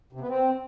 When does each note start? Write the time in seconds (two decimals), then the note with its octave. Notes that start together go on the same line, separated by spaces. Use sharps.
0.13 C3
0.21 B3
0.29 C4